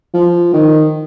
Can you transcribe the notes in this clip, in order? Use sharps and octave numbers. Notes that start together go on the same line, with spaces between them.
F3
D#3